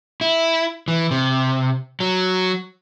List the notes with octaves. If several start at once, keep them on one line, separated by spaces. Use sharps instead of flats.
E4
E3
C3
F#3